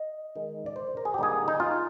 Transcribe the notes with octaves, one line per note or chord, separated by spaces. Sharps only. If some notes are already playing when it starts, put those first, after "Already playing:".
Already playing: D#5
D#3 G#3 D#4
D5
C5
A#4
G#4
G4
D3 G3 A#3 D#4 G#4
D#4
F4